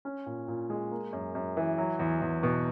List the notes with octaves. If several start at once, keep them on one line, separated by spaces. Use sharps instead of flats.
C#4
A#2
A#2
G#3
A#3
F#2
F#2
E3
F#3
E2
E2
B2